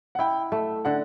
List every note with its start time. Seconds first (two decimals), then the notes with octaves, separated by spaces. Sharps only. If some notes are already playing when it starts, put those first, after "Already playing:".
0.15 F#5
0.19 E4 G5
0.52 A3
0.85 D3 F#5